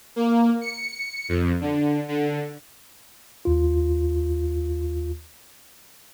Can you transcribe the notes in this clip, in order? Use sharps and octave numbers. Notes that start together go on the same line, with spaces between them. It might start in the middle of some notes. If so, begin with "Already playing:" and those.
A#3
C#7
F2
D3
D3
D#2 F4